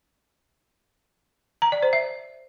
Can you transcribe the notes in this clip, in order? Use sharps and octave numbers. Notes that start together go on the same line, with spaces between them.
A#5
D5
C5
E5